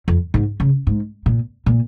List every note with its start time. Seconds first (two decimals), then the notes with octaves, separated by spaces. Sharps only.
0.08 F2
0.34 G#2
0.60 C#3
0.87 G#2
1.26 A#2
1.66 A#2